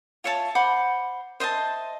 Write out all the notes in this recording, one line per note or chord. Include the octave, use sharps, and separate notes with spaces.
F4 C#5 E5 A5
C5 F#5 B5 D6
C5 D#5 E5 A5